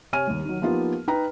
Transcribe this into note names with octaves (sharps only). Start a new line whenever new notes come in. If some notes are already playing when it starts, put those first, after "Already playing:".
C3 C#5 G#5 F6 D#7
D#2 G3
D#3 F#3
F3 A#3 B3 D#4 F4 G4
D#4 B4 G5 A#5